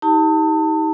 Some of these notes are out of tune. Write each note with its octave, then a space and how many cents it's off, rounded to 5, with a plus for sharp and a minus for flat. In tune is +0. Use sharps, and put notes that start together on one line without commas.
D#4 +35 G4 +5 A5 +30